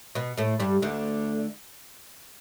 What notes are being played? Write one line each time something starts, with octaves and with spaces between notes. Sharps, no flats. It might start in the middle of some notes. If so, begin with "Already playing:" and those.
B2 B3
A2 A3
G2 G3
D2 D3